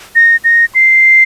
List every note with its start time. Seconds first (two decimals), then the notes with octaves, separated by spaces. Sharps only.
0.15 A#6
0.44 A#6
0.75 C7